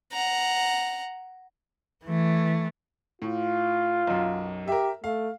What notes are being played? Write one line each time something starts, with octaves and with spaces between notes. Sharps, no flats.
F#5 A#5
E3 A3
A2 F4
B1 F#2
G4 A#4 E5
A3 F5